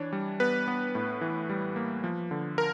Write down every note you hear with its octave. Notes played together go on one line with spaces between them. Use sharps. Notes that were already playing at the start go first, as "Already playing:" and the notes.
Already playing: E3 D4 C#5
G3
B3 B4
B3
A2
E3
G3
A#3
F3
D3
A#4